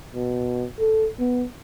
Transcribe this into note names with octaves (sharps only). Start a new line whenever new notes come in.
B2
A4
B3